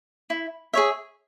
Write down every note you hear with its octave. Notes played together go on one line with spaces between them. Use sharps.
E4
G#4 C#5 E5